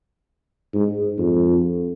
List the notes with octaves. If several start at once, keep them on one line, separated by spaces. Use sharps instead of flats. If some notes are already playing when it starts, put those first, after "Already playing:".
G#2
F2